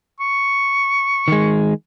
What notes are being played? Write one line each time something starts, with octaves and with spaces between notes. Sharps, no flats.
C#6
D#3 G#3